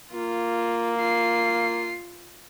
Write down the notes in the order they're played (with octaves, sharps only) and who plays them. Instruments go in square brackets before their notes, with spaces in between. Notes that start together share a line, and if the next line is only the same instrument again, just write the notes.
[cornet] A#3 [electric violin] F4
[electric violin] F4 C7